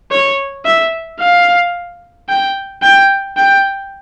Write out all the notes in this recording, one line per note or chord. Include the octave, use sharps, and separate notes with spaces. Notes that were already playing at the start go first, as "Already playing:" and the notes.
C#5
E5
F5
G5
G5
G5